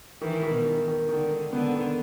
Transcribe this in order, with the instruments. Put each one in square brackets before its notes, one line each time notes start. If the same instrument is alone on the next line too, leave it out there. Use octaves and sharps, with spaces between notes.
[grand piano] D#3 [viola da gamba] E3
[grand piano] D#3
[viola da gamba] B2
[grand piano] D#3
D#3
[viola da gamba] D3 [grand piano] D#3
[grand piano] D#3
[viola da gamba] D3 [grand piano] B3
[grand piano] D#3